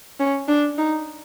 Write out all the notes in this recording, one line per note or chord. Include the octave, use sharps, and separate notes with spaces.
C#4
D4
D#4